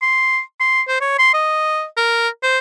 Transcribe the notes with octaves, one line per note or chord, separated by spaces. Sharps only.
C6
C6
C5
C#5
C6
D#5
A#4
C5